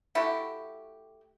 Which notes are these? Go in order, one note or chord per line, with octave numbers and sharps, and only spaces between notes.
A3 E4 F#4 G4